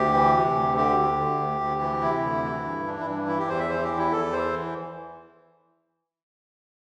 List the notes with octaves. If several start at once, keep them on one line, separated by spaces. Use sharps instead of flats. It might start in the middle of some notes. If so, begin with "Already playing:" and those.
Already playing: D2 G4
E3
C3
D2
D3 G4
D2
D3
D2
D2
E3
C3 E4
D2
E3
G2
E3 D4
E4
G2 D4
E3 E4
G4
E2 C5
E5
E3 C5
G4
E2
E4
E2 A4
E3 C5